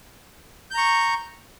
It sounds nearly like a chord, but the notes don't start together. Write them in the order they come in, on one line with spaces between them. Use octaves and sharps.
G6 A#5 C#6